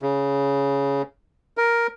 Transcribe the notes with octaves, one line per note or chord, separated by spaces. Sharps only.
C#3
A#4